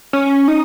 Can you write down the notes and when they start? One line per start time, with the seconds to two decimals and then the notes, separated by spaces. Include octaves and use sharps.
0.13 C#4
0.48 D#4